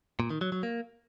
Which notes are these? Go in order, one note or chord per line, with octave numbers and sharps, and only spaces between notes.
A#2
D#3
F#3
F#3
A#3